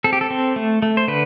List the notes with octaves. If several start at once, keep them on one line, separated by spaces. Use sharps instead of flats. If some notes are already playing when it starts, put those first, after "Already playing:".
C4 A4
G4
A4
C4
A3
A3
C5
D3 B4